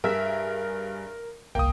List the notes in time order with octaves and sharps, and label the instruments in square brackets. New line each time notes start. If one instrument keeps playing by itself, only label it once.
[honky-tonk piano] G2 G#4 B6 [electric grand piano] A#4 [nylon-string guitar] E5
[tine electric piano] G1 C2 [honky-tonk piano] A#3 [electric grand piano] G5 D#6